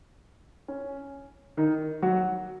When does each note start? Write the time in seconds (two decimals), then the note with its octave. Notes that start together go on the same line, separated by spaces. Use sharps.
0.68 C#4
1.57 D#3 D#4
2.02 F#3 F#4